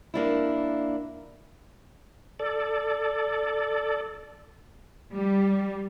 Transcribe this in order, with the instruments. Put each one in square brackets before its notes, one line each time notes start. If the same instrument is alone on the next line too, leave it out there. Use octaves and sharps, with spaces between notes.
[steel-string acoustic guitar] A#3 D4 E4
[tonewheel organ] A4 D5
[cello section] G3